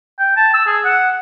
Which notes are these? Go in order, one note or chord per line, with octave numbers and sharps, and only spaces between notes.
G5
A5
E6
G#4
F#5